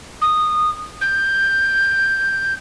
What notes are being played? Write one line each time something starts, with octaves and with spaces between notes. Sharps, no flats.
D#6
G6